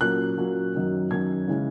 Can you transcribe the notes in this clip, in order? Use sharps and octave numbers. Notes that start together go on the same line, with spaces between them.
A#2 F#3 A#3 C#4 F#6
A#2 F#3 A#3 C#4
F#2 D#3 F#3 C#4
F#2 D#3 F#3 C#4 G#6
C#3 E3 G#3 C#4